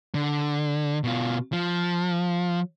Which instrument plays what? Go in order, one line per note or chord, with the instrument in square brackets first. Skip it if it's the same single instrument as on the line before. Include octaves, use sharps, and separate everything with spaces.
[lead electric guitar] D3
B2 F4
F3